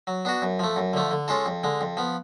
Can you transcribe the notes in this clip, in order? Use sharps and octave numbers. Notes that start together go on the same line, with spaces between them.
F#3
B3 D4 F#4
F#2
F3 A3
F#2
D3 F3 A3
D3
G#3 C#4 F4 A4
F2
D3 G#3
F2
F3 B3